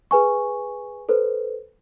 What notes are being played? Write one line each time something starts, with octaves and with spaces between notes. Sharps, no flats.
G#4 B4 G#5 C#6
A4 B4 C5